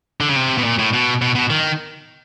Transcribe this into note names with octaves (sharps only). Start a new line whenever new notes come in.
D3
C#3
C3
B2
A#2
A2
B2
B2
B2
D#3